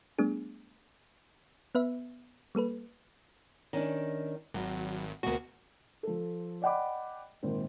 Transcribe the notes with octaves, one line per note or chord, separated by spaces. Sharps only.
G3 A3 B3 D4 G#4
B3 B4 E5
G3 A#3 A4 B4
D#3 C#4 D4
G#1 F#3
D2 B2 A#3 F#4
F3 A4
D5 D#5 F#5 G5 B5 D6
G#1 A#2 C4